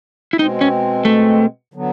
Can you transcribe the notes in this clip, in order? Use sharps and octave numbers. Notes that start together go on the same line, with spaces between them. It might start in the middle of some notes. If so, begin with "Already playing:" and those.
E4
B2 G#3 C4 D#4
C#4
A3
D3 F#3 B3